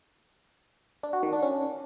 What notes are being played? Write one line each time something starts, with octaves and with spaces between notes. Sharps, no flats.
D4
F#4
D#3
D4
C#4